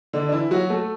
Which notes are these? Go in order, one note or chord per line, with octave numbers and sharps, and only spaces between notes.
D3 D4
D4
E3 E4
F#3 F#4
A3 A4